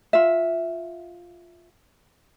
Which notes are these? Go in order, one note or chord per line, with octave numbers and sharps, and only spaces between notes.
F4 E5